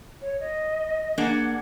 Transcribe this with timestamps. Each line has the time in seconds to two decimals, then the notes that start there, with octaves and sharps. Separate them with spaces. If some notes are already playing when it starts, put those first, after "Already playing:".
0.22 C#5
0.40 D#5
1.18 A#3 D4 G#4 F#5